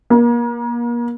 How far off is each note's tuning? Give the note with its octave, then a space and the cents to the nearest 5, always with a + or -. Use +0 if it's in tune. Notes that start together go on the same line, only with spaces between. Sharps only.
A#3 +35